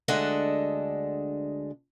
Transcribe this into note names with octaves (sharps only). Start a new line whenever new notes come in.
D2 G#3 D4 A4 D#5 F#5